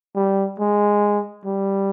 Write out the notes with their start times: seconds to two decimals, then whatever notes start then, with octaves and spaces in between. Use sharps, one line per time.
0.16 G3
0.60 G#3
1.45 G3